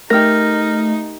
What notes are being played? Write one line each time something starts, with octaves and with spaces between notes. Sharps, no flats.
A3 D#4 G4 A#4 F6 A#6